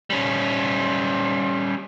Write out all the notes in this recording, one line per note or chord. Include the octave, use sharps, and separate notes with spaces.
G3 C#4